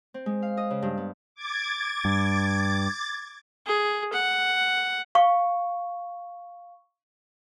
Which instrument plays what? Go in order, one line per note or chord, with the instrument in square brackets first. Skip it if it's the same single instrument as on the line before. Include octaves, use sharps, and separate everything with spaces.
[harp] C4
G#3
F5
D#5
C#3
G2
B3
[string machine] D6 G#6 A6
[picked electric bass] G2
[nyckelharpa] G#4
F#5
[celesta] F5 C#6